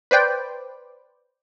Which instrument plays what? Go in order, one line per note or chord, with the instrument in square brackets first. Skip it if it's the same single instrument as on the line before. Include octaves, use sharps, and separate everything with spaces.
[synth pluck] B4 C5 D5 G5